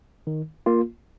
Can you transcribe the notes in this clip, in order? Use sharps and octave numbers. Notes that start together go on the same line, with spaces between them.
D#3
A#3 F4